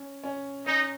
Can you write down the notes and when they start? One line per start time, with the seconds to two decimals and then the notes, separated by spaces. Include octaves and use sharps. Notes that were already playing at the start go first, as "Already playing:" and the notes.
Already playing: C#4
0.24 C#4
0.66 C#4 D#4